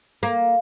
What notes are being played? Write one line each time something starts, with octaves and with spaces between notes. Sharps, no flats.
A#3